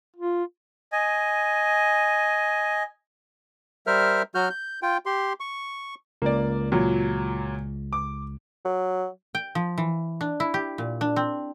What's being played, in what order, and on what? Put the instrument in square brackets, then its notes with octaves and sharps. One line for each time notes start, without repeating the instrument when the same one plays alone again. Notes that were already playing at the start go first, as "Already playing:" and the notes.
[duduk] F4
[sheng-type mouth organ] D#5 G#5
[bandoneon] G3 A#4 C5 E5 F6
F#3 F#4 F6 G6
G6
F4 G5
G4 C6
C#6
[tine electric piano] C#2 [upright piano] A#3 D5
[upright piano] A#2 F#3
D6
[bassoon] F#3
[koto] G5
F3
E3
D4
E4
G4
A#2
D4
C4